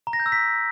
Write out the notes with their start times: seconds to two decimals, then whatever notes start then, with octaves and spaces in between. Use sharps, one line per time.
0.07 A#5
0.13 A#6
0.20 G6
0.26 E6
0.32 B6